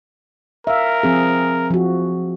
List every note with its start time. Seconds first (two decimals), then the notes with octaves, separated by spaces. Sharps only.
0.67 A#4 E5 F5
1.03 F3 C4 G#4
1.71 F3 F#4